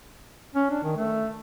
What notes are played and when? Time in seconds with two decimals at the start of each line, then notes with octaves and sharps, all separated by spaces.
0.55 C#4
0.70 D4
0.83 D#3
0.97 A3